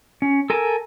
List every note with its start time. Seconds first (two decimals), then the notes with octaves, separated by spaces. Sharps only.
0.22 C#4
0.50 A4 A#4 G#5 A5